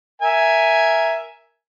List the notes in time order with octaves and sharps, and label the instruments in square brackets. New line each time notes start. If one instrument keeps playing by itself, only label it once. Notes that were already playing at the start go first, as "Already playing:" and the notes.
[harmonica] A#4 E5 G#5